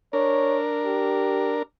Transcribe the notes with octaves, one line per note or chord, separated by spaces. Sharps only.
D4 A#4 C#5
G4